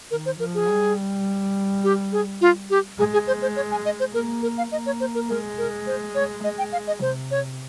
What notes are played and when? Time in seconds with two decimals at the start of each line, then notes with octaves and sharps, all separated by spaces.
0.11 D#3 A#4
0.26 C5
0.40 F3 A#4
0.54 G#4
0.69 G3
1.84 G4
2.12 G#4
2.41 F4
2.70 G4
2.99 G#3 G#4
3.13 G#4
3.27 C5
3.42 C5
3.56 C#5
3.71 G#5
3.85 D#5
4.00 C5
4.13 A#3 A#4
4.42 A#4
4.58 F5
4.71 A#3 D#5
4.86 C#5
5.00 C5
5.15 A#4
5.29 G#3 A#4
5.58 A#4
5.87 C5
6.15 C#5
6.44 G#3 D#5
6.58 G5
6.72 F5
6.87 D#5
7.01 C3 C5
7.31 C#5